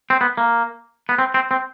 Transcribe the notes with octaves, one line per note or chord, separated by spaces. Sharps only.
C4
B3
A#3
B3
C4
C4
C4